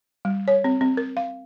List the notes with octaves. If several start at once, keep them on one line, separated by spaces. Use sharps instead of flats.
G3
C#5
C4
C4
A#4
F5